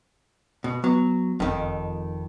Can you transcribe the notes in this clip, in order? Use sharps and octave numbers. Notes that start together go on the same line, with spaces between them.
B2
F#3 B3
F#1 F2 D#3